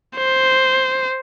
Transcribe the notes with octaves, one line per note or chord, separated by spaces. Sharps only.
C5